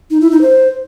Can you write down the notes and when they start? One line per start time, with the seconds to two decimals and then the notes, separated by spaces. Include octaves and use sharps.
0.11 D#4
0.21 E4
0.31 D#4
0.41 C5